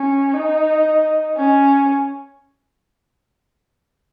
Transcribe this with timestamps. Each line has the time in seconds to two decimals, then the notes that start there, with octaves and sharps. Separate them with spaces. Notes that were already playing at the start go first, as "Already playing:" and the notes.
Already playing: C#4
0.34 D#4
1.36 C#4